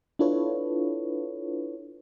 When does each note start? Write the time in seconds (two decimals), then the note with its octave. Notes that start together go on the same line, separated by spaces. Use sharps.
0.19 D4 E4 F4 A4 B4 C#5